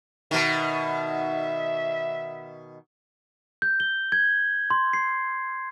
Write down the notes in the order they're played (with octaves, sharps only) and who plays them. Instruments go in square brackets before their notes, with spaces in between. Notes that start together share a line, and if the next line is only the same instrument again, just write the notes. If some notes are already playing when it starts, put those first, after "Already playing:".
[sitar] B2 D#3 [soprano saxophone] E5
[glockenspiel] G6
G7
G#6
C6
C7